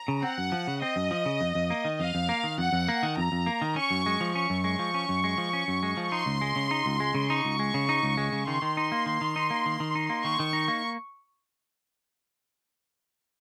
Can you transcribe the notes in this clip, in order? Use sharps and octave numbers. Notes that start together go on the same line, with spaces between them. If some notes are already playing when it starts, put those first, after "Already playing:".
Already playing: A#5
C#3
C4 F#5
F#2
F3
C#3
C4 D#5
F#2
F3
C#3
F2
F2
A#3
D#3
F2 F5
F2
A#3
D#3
F2 F#5
F2
A#3
D#3
F2 A#5
F2
A#3
D#3
C#4 C#6
F#2
G#3
F3
C#4 C#6
F#2
G#3
F3
C#4
F#2
G#3
F3
C#4
F#2
G#3
F3
D#4 C6
C#2
G#3
C#3
D#4
C#2
G#3
C#3
D#4 C#6
C#2
G#3
C#3
D#4
C#2
G#3
C#3
D#3 C6
D#3
D#4
A#3
D#3
D#3
D#4
A#3
D#3
D#3
D#4
A#3
D#3 C#6
D#3
D#4
A#3